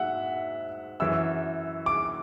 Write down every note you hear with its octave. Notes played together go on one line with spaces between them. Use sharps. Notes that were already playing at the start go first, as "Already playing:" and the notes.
Already playing: G#2 F#3 E5 F#5
F#2 E3 E6
D6